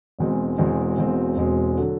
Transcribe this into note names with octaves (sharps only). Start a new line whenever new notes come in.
E1 E2 B2 G#3 C4
E1 E2 B2 G#3 C4
E1 E2 B2 G#3 C4
E1 E2 B2 G#3 C4
D3 F#3